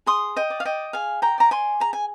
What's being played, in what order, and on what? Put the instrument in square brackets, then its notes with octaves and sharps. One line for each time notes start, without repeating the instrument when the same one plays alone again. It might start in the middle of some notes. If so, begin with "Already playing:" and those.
[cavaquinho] G#4 C6 D#6
D#5 G5
D5
F5
D#5 G5
G#4 F5 G#5
G5 A#5
D5 A#5
G#5 C6
G#4 A#5
G#5